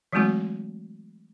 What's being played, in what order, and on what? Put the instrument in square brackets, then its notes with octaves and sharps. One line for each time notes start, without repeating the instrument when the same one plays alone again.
[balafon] E3 F#3 G#3 A3 C4 F#4